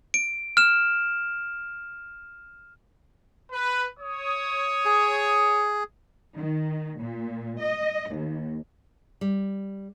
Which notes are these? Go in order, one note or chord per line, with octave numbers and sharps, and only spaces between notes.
D7
F6 E7
B4
C#5 D#6
G#4
D#3
A#2
D#5
D#2
G3